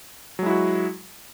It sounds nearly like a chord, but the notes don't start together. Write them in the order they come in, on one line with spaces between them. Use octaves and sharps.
F#3 G#3 E4 F#4